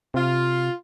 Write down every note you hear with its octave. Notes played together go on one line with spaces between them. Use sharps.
C3 F4